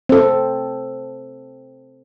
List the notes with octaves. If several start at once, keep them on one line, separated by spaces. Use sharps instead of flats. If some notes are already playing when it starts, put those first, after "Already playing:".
C4 A4